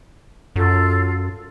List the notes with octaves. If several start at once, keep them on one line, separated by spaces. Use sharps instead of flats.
F#2 F4 A4